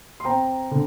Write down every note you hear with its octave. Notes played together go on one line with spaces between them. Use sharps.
C6
C4 G5 A#5
D3